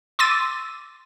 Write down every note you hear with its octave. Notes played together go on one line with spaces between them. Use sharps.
C6 D6 E6 A6 D#7